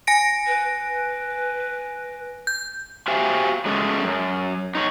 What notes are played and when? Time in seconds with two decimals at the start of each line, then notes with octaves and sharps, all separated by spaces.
0.07 G#5 A#6 D7
0.47 B4
2.47 G6
3.08 F#4 G4 C5 E5 F5 G#5
3.65 F#3 G#3 A3 C#4 G#4
4.03 F#2
4.75 D#4 C5 C#5